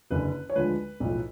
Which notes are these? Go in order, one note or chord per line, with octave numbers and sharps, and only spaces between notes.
F#1 F#2 D3 B4
C#5
D2 D3 F3 G#3 B4
B1 A2 F3